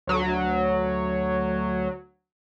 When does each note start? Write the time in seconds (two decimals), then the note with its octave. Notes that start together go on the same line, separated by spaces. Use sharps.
0.07 D2 F#3